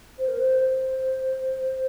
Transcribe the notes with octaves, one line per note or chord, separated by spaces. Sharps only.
C5
A#4
C5
C5